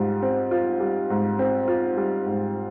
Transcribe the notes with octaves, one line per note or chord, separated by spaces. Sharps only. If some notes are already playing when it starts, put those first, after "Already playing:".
Already playing: G#2 G3 F4
C4
F4
G3
G#2
C4
F4
G3
G#2